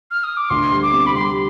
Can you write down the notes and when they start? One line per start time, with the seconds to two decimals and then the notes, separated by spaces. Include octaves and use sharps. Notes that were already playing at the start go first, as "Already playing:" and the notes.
0.11 F6
0.24 D#6
0.37 D6
0.50 D2 C6
0.71 G3
0.83 D6
0.93 C3
1.06 B5
1.15 G3 C6